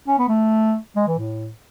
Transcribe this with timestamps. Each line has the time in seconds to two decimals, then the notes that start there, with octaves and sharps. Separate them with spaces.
0.08 C#4
0.18 B3
0.28 A3
0.96 G#3
1.07 E3
1.18 A2